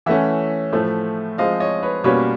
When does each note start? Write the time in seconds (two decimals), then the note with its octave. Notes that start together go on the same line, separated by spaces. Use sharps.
0.06 E3 A3 C#4 E5 F#5
0.73 A2 F3 A3
1.38 F3 G#3 C4 D#5 F5
1.60 C#5 D#5
1.83 B4 C#5
2.04 B2 G3 A#3 C#4 B4 C#5